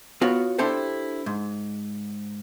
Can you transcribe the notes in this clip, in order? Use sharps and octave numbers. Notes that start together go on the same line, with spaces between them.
B3 F4 F#4 C#5
D4 E4 G4 A4 C5
G#2